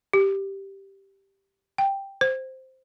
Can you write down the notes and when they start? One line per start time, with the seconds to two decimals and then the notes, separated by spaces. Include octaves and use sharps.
0.13 G4
1.78 G5
2.21 C5